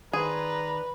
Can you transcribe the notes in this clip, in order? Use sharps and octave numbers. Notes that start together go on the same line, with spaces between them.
D#3 G#4 B4 C5 D5 A#5